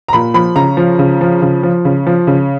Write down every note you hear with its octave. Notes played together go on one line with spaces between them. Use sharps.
A#5
A#2 B5
F3 B5
C#3 A#5
F3
C#3
F3
C#3
F3
C#3
F3
C#3